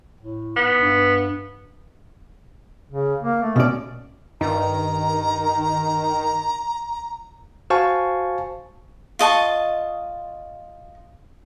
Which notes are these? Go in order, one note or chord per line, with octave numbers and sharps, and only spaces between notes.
A2
G#2 B3
G2
C#3
A#3
A3
B2 C#4 D5
G2 D#3 A#5
F#4 C5 F5 G#5 A5 C#6
F4 D#5 A5 C#6